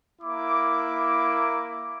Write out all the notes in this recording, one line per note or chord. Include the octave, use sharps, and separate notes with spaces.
A#3 E4 D6